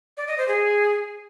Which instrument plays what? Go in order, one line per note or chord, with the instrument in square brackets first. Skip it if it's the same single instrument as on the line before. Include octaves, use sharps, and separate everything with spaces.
[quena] D5
D#5
C5
G#4